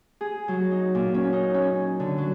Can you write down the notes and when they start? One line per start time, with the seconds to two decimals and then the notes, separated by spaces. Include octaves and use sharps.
0.21 G#4
0.48 F#3
0.72 D#4
0.95 A#2
1.14 C#4
1.33 D#4
1.54 C#4
2.00 D3
2.18 F#3